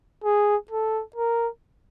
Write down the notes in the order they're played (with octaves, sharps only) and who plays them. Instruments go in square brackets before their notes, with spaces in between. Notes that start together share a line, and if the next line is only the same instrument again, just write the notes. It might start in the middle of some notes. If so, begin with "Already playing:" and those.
[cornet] G#4
A4
A#4